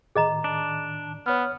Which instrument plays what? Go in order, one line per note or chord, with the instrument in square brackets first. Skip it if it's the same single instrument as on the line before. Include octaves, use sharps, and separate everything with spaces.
[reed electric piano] A2 D#3 [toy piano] G#4 D#5 A#5
[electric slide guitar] D4
[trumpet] B3 [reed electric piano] C#5 F6